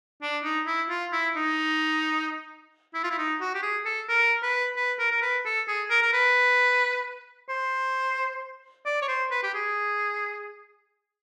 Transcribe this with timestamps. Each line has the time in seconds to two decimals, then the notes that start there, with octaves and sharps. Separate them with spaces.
0.22 D4
0.44 D#4
0.67 E4
0.90 F4
1.12 E4
1.36 D#4
2.94 E4
3.04 F4
3.11 E4
3.18 D#4
3.41 F#4
3.54 G4
3.62 G#4
3.85 A4
4.09 A#4
4.43 B4
4.76 B4
4.99 A#4
5.11 A#4
5.22 B4
5.45 A4
5.68 G#4
5.90 A#4
6.02 A#4
6.13 B4
7.49 C5
8.86 D5
9.02 C#5
9.08 C5
9.31 B4
9.43 G4
9.54 G#4